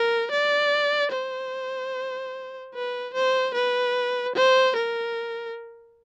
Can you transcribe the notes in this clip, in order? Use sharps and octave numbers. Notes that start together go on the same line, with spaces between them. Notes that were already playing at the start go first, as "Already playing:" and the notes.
Already playing: A#4
D5
C5
B4
C5
B4
C5
A#4